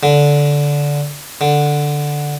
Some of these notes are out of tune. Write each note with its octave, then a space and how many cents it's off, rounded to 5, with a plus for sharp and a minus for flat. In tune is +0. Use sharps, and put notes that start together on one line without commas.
D3 -15
D3 +0